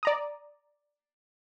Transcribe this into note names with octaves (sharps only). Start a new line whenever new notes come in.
D5 A#5 D#6